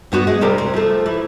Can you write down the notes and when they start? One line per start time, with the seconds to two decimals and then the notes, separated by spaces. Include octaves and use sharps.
0.12 G2 B3 F#4
0.27 G#3
0.41 C3 G3 A#4
0.58 C4
0.73 F3 A3
1.06 E3